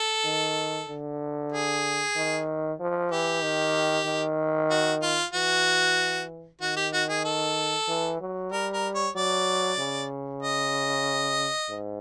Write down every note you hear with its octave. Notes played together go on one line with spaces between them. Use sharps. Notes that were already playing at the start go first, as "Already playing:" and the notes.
Already playing: A4
D#3
D3
G#4
D#3
F3
E3 G4
D#3
D#3
F#4
F4
E3 F#4
D#3 F#4
G4
F#4
G#4
A4
E3
F#3
G3 A#4
A#4
C#5
F#3 D5
C#3
D#5
G#2